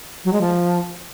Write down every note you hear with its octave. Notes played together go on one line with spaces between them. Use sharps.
F#3
G#3
F3